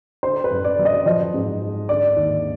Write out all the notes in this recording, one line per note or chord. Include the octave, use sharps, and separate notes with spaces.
D3 C5
B4
F#2
D5
F#3
D#5
F3 D#5
G#2
G#3
D3 D5
D#2